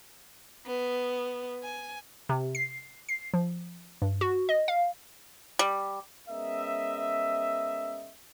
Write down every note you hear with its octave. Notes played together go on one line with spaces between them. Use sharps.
B3
G#5
C3
C7
C7
F3
G2
F#4
D#5
F5
G3
G#3 B3 C#4 A#4 D#5 E5